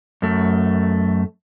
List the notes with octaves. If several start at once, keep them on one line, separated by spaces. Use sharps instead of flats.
F#2 A3